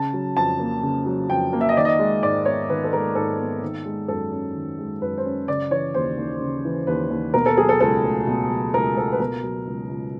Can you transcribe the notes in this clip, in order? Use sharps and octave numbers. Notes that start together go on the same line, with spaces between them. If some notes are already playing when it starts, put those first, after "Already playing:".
Already playing: C#3 A5
F#3
F2 A5
A#3
C#3
F#3
F2 G5
A#3
E5
D#5
D#3 D5
D#5
G#3
G#2 D5
B3 C#5
D#3 B4
A4
G#3 A#4
G#2 A4
B3
D#3
G#3
F#2 A4
C#4
D#3
G#3
F#2 B4
C5
C#4
C#3 D5
E3 C#5
D#2 C5
D#2
C#3
E3
D#2 B4
D#2
B2 A#4
A4
F#3 G#4
A4
C#2 A4
A3
B2
F#3
C#2 A#4
A3 A4
B4
B2 A#4
F#3
C#2
C#2